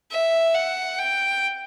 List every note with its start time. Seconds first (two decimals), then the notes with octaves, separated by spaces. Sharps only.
0.11 E5
0.54 F#5
0.99 G5